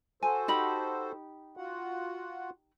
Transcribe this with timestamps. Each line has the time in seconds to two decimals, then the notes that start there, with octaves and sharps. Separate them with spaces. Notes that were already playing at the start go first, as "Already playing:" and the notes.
0.23 F#4 A4 C5 G#5
0.48 D#4 G4 B5
1.57 F4 F#4 F#5